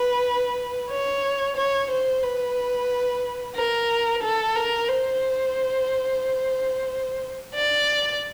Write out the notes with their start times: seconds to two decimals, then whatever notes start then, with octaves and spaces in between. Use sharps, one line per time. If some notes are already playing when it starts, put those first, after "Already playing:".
Already playing: B4
0.90 C#5
1.56 C#5
1.90 C5
2.23 B4
3.56 A#4
4.22 A4
4.55 A#4
4.89 C5
7.55 D5